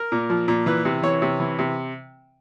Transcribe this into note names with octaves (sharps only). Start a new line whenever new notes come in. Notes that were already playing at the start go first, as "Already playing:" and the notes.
Already playing: A#4
A#2
F3
A#2
E3 B4
C3
E3 C#5
C3
E3
C3